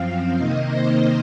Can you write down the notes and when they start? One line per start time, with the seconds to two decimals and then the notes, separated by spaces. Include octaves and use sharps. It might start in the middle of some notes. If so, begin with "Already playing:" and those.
Already playing: F#2 F3 C4 F5
0.38 C3 D#3 A#3 D#4 D#5
0.72 C5